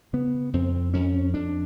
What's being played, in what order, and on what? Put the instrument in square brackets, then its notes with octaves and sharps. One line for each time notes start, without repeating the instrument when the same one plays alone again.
[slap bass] C#3 B3
F2 C4
F2 C#4
F2 D4